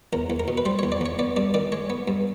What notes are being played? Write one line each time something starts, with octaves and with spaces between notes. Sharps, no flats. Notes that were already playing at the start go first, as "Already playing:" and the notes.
E2 A#4
E2
A#4
B2
B4
G3 C5
E2 C#5
D5
E2 C#5
B3 D5
G2 D5
D#3 D5
G#3 C#5
B3
G2